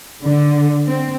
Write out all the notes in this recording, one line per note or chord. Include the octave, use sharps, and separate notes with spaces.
D3
C4